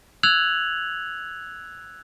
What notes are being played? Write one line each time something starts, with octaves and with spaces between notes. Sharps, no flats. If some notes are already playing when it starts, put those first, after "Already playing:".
E6 F#6 G#6 F7 F#7